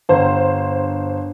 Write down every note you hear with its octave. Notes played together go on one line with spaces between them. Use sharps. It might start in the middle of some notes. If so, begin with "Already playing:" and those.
G1 C5